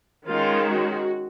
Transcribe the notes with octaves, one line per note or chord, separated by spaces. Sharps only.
D#3 G#3 C#4 F4
F#4